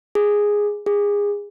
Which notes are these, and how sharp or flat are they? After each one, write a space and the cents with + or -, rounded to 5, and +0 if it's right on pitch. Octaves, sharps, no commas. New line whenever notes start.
G#4 -5
G#4 -25